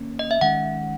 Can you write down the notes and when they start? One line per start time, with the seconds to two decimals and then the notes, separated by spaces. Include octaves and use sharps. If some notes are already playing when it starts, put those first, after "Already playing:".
Already playing: D#3 A#3 C#4
0.19 D#5
0.31 E5
0.41 D#3 G#3 C#4 F#5